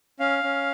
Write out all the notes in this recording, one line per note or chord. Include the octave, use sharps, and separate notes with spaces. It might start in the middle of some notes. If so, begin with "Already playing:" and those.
C#4 F5
C#4